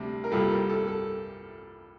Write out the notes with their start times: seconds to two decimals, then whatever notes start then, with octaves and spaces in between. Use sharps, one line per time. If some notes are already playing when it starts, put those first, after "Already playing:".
Already playing: D2 C3 G3
0.24 A#4
0.32 C2 A#2 G3 A4
0.50 A#4
0.69 A4
0.88 A4